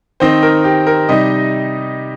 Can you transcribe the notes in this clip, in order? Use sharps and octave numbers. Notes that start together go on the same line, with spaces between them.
D#3 C4 D#4 C5
A#4
G4
A#4
C3 G3 D#4 D#5